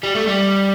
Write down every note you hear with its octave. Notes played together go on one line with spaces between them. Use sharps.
G3
A3
G3